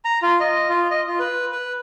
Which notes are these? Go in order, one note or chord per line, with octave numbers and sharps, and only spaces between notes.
A#5
F4
D#5
F4
D#5
F4
B4
B4